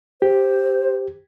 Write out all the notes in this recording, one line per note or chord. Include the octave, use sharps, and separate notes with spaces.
G4 C5